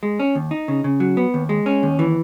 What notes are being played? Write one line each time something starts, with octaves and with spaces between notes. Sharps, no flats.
G#3
C#4
D#2
D#4
C#3
C#3
F#3
B3
D#2
G#3
C#4
D#2
E3